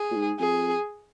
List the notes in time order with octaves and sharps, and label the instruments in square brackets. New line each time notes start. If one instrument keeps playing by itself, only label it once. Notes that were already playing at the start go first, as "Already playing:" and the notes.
Already playing: [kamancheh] G#4
[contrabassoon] A#2
G#2
[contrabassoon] F2 [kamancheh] G#4